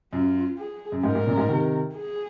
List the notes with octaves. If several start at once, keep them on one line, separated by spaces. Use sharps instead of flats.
F#2 F4
G#4
F#2
G#2 A#4
G#2
F#2 A#2
G#2
C3 D#3
G#4